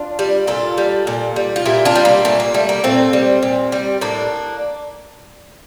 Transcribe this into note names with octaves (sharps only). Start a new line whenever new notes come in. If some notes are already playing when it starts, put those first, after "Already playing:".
Already playing: D4 F4
G3
A#2 F4 A4
G3
A#2
G3
F4
A#2 E4 G4
D4 F4
G3
A#3
A#2 A3
A#3
G3 A3
A#3
A#2 A3 C4
G3
A#2
G3
A2 A#3 D4